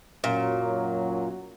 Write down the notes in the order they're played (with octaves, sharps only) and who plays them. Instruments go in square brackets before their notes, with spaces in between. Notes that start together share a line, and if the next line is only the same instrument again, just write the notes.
[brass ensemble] F#2 F#3 [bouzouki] A#2